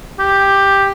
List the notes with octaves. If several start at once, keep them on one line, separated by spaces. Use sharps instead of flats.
G4